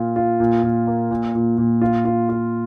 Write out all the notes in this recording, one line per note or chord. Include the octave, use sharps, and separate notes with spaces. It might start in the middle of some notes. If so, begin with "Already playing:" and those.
Already playing: A#2 F4
F4
A#2
A#2
A#3
A#2
A#2
A#2
F4
F4
F4